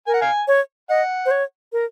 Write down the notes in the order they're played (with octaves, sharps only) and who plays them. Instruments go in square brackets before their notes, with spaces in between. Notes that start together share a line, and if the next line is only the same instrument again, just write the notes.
[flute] A#4 [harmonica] G#5
[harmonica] F#5
F5 G#5
[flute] C#5
[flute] D#5 [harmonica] F#5
[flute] C5
C#5
A#4